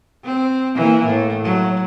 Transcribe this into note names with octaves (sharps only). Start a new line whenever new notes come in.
C4
E3 A#3
A2
F#3